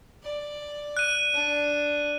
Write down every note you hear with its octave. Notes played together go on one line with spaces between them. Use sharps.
D5
F#6 D#7
D4